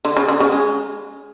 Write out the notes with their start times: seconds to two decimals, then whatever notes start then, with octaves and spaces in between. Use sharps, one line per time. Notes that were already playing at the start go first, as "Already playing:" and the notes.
0.05 D3
0.17 C#3
0.28 D3
0.40 C#3
0.52 G#3